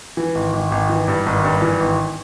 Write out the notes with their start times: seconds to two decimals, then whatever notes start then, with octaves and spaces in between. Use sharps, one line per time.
0.17 E3
0.35 G#1
0.53 G#1
0.72 G#1
0.89 E3
1.08 G2
1.26 G#1
1.44 G2
1.62 E3
1.80 G#1